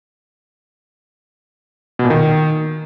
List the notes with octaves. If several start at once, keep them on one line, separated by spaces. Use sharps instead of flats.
B2
A#2
D#3